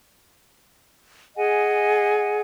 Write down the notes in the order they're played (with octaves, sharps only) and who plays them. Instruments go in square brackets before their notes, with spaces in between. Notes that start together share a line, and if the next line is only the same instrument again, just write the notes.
[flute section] G#4 D#5 F#5 G#5